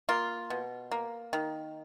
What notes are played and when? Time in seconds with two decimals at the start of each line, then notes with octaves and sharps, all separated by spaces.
0.09 A#3 F4
0.50 B2
0.91 A#3
1.33 D#3